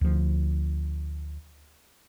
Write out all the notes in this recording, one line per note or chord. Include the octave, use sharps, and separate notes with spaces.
D2 F3